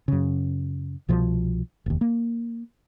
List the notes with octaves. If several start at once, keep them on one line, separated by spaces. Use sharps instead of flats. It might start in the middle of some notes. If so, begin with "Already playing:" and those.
F#2 C#3
C2 B2 F3
F1 D#2
A#3